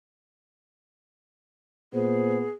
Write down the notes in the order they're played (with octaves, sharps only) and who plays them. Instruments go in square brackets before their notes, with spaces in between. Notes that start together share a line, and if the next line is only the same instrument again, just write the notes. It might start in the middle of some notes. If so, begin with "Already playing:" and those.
[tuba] A#2 [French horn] B3 [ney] G#4 [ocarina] C5